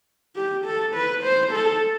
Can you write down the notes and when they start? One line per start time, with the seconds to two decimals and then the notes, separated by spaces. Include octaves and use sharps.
0.36 G4
0.65 A4
0.94 B4
1.23 C5
1.52 A4